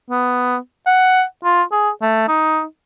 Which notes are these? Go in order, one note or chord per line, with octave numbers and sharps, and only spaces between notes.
B3
F#5
F4
G#4
A3
D#4